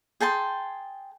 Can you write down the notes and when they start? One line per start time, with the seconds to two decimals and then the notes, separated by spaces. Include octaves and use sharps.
0.20 G#4 G5 A5 C6